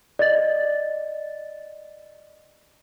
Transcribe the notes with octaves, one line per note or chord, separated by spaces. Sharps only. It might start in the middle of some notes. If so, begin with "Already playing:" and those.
D5 D#5 A6